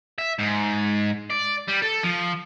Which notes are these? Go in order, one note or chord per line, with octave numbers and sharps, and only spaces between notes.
E5
G#2
D5
G3
A4
F3